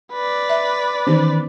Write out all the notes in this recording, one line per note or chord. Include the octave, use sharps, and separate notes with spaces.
B4 D5
E5
D#3 E3 B3 C#4 D#4 G4